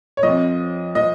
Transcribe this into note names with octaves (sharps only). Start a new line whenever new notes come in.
C#5
F2 F3 D#5
F3 D#5